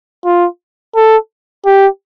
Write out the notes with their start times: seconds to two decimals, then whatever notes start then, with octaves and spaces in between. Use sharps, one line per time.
0.25 F4
0.96 A4
1.66 G4